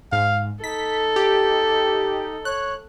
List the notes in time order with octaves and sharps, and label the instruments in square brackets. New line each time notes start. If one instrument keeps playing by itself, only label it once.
[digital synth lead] G#2 [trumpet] F5
[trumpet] D#4 [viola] A4 [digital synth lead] B6
[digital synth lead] G4
[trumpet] C#5 [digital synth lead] F#6